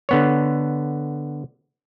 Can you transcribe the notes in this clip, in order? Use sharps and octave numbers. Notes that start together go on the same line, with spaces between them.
D3 B3 C#5